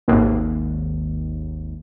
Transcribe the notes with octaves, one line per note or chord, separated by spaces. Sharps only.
G#1 D#2